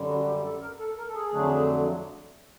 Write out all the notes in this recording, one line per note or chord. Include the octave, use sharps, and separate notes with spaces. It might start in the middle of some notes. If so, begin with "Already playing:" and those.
Already playing: F#2 D3 G3
F#4
G4
A4
A#4
A4
A#4
A4
G#4
F2 D3 F#3 A3 D4